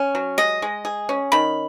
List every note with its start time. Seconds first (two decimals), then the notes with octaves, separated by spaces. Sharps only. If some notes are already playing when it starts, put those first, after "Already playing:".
Already playing: C#4
0.15 F#3
0.38 G#3 D#5
0.62 G#3
0.85 G#4
1.09 C#4
1.32 D#3 B5